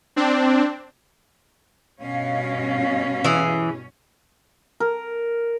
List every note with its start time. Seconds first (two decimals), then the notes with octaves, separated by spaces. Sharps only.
0.16 C4 D4
2.00 G2 B2 C#4 D#5 F5
3.24 E3 G#4
4.80 A#4